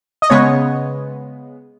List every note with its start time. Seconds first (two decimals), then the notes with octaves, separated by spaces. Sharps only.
0.22 D#5
0.30 C#3 G#3 B3 C#5